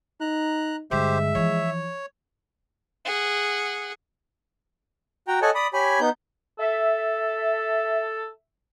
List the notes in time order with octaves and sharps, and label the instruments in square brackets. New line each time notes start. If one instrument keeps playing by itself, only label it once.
[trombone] D#4 [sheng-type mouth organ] A#5 F#6
[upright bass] G2 D3 [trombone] G#3 [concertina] G4 C5 [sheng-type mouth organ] E5
[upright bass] E3 F3 [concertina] C#5
[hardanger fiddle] G#4 F#5
[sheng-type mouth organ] F#4 G5 A#5
A4 C#5 D#5 F#5 G#5 A5
D5 B5 D#6
G4 C#5 G#5 B5
B3 D#4 G6
[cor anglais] A4 [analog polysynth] E5